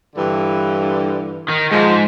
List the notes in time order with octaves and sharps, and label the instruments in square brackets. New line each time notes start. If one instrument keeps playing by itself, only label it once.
[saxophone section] G2 D3 E3
[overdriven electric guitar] D#3
[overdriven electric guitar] G#2 [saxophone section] F3 G#3